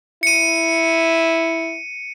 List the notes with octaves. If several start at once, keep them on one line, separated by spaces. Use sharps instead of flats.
E4 C#7 D#7